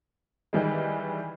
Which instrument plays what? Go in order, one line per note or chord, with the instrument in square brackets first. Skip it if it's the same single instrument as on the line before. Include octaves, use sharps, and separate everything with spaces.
[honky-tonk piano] D#3 E3 G3 G#3